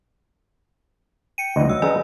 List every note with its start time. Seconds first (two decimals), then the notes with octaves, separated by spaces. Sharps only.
1.38 G5 C#7 D#7
1.56 D2 E3 D#5
1.69 F#3 E6
1.82 E3 C#4 G#4 B4 D5 A#5